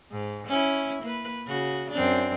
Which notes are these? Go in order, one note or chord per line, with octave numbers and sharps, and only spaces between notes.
G#2
C#4 E4
A#3 B4
C#3 F#4
F#2 C4 D4